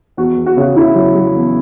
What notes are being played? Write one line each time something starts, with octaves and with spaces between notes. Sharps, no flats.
E2 F#4
E2
F#4
C#3 F#4
C#3 E4
F#3
F#3
E2